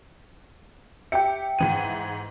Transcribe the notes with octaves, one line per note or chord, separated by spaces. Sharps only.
G4 E5 G5 C#7
G#2 E3 D#7